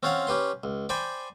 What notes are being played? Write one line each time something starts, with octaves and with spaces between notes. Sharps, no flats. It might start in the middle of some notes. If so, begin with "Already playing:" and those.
C4 C#4 F4 C#5 F5 F#5
C#4 G4 B4 C6
C#2
C5 D5 G5 G#5 B5